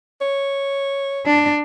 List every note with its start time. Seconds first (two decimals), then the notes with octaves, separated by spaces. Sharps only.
0.21 C#5
1.26 D4